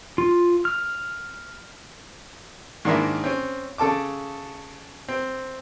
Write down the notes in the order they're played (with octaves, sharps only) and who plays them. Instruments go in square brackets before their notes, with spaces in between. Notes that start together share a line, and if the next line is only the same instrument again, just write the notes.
[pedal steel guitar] F4
F6
[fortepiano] G#2 D#3 A#3 D4 E4
C4 C#4
C#3 A4 A5 D6
C4